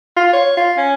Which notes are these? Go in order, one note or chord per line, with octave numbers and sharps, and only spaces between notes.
F4
C#5
F4
C#4